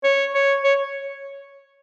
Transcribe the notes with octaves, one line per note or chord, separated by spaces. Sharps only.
C#5
C#5
C#5